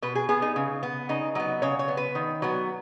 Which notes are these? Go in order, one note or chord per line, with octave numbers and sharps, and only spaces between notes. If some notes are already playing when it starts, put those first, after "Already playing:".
B2 B4
G#4
B3 G#4
D#4
C#3
B3
C#3 D#4
F#3 B3 D#5
C#3 C#5
C#5
B3
B4
D#3
F#3 B3